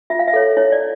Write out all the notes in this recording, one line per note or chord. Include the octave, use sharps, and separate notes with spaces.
F4 E5
F5
E5
A4 C#5
E4 C#5
D5